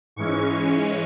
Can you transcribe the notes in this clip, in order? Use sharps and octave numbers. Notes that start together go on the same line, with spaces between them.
G#2 E3 G#3 C#4 C#6